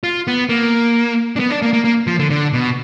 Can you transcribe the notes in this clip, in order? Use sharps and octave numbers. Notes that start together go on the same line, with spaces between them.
F4
B3
A#3
D4
B3
D4
A#3
A#3
A#3
F3
D3
D3
B2